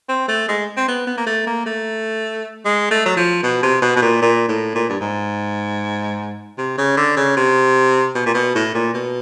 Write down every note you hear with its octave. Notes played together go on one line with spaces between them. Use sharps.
C4
A3
G#3
C4
B3
B3
A#3
A3
A#3
A3
G#3
A3
F#3
F3
B2
C3
B2
B2
A#2
A#2
A2
A#2
G2
G#2
C3
C#3
D3
C#3
C3
B2
A#2
B2
A2
A#2
B2